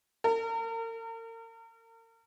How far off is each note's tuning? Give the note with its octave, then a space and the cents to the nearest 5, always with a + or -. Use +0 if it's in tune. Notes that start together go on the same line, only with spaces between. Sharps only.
A#4 -40